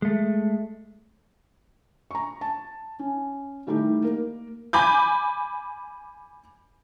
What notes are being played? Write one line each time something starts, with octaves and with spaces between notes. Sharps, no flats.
G#3 A3
A#5 C#6
A5
C#4
D#3 G3 A3 D#4 E4 G4
A#3 A#4
G#5 B5 D6 G6